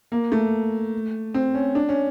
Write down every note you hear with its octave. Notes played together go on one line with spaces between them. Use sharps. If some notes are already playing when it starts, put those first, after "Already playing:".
A#3
A3
C4
C#4
D4
C#4